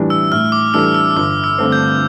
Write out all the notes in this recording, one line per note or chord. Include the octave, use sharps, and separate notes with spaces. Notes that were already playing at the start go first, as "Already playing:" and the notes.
Already playing: A2 E3 G3 D4
E6
A2 F6
D6
E3 G3 D4 A4 E6
E6
G1 D6
E6
G2 D3 A3 C4
G6